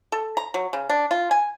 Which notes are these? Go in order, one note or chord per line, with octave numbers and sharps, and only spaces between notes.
A4
A#5
F#3
C#3
D4
F4
G#5